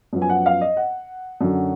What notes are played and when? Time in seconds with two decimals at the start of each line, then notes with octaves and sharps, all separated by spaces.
0.13 F#2 F3 B3
0.22 G#5
0.29 F#5
0.46 F5
0.61 D#5
0.77 F#5
1.41 F#2 D3 F#3